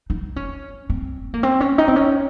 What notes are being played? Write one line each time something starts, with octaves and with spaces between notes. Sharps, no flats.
D#4
C#4
C4
A#3
C4
C#4
D#4
C4
C#4